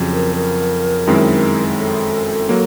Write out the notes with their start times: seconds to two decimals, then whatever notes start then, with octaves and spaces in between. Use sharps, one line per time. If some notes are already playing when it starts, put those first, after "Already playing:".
Already playing: F2 C#3 F#3
0.12 A#4
0.36 A#4
1.07 F#2 D#3 G#3 C4 E4
1.77 A4
2.49 F#3 A#3